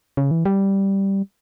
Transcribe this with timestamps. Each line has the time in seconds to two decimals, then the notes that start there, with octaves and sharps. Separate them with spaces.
0.17 C#3
0.31 E3
0.46 G3